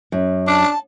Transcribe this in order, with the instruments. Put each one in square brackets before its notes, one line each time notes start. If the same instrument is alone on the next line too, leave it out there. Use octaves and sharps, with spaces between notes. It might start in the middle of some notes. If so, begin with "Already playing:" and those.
[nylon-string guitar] F#2
[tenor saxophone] D4 [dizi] A5